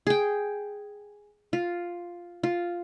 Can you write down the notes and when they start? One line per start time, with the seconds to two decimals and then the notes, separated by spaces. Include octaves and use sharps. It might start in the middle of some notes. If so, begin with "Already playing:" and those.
0.07 G#4 G5
1.53 F4
2.43 F4